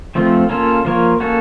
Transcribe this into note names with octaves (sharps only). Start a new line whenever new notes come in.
F3 A3 C4 F4
A#3 C#4 F4 A4
F3 A#3 F4 A#4 C#5
A#3 C#4 F#4 A4